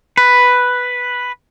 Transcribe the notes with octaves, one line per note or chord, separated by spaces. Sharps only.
B4